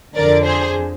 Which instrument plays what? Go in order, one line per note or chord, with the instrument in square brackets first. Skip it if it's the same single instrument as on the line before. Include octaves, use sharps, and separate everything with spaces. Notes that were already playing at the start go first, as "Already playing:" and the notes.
[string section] F2 D3 A#4 D5
G#4 C5